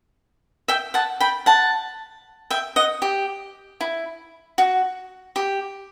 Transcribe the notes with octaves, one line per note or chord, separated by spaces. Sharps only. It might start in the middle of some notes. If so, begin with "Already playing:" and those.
E5 G5
F#5 A5
G5 B5
F#5 A5
E5 G5
D#5 F#5
G4
E4
F#4
G4